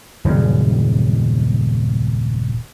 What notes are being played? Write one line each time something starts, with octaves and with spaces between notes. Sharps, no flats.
D#1 F#2 C#3